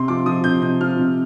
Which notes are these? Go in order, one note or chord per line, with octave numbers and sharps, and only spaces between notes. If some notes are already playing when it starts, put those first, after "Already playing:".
Already playing: C3 C6
F3 D6
F3 D#6
C3 G6
C3 G6
F3 F6
C3